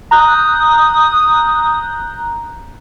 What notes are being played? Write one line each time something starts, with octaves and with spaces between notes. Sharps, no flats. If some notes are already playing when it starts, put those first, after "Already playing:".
A#5 D#6 F#6 G6